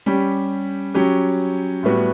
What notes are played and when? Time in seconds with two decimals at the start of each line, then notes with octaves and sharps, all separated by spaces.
0.06 G3 C#4 G4
0.94 F#3 C#4 G4
1.83 A2 G3 B3 F#4